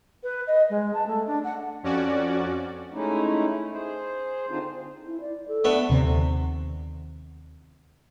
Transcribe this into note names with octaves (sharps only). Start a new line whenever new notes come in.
B4
D#5
G#3
A5
A3
D4
F#5
F2 C#4 F#4 D5
G#3 A3 C#4 D#4 E4
G#4 C5
D3 C4 D4 D#4 F4 C5
E4
D5
A4
A3 B3 D4
D#2 C3